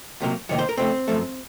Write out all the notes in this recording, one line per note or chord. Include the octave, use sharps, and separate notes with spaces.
C#2 C3 F#3 A#3
F2 C3 D#3 A#3 C#5
C5
A#4
F2 C#3 A3 C4 C5
F#2 F3 A3